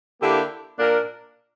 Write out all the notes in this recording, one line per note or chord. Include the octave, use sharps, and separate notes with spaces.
D3 A#3 E4 G4
A#2 A#3 D4 A#4